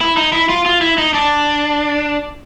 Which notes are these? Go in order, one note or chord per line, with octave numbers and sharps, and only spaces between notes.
E4
D#4
E4
F4
F4
E4
D#4
D4